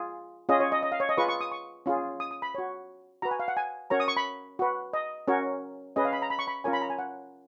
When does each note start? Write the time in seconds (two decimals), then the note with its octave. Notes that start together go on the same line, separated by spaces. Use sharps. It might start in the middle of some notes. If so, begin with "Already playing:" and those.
Already playing: F4 G#4
0.49 C#4 F4 G#4 D#5
0.60 C#5
0.72 D#5
0.83 D#5
0.92 F5
1.00 C#5
1.09 D#5
1.17 F4 G#4 B4 C#6
1.29 C#6
1.41 D#6
1.52 C#6
1.86 C#4 F4 G#4
2.20 D#6
2.31 D#6
2.42 B5
2.55 F#4 C#5
3.22 F#4 B4 A#5
3.31 G#5
3.40 F5
3.48 F#5
3.57 G#5
3.90 C#4 F#4 A#4 C#5 A#5
4.00 D#6
4.08 C#6
4.17 B5
4.59 F#4 B4
4.93 D#5
5.28 C#4 F#4 A#4 C#5
5.96 C#4 G#4 B4 D#5
6.05 F5
6.13 B5
6.22 A#5
6.30 B5
6.39 C#6
6.47 B5
6.64 C#4 F4 A#4 C#5 G#5
6.73 B5
6.82 A#5
6.90 G#5
6.99 F#5